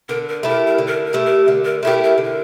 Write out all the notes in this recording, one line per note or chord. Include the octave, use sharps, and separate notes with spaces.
D3 A#4
A#4
A3 E4 G4 A#4
A#4
D3
A#4
A#4
A3 E4 G4
A#4
D3 A#4
A#4
A3 E4 G4 A#4
A#4
D3
A#4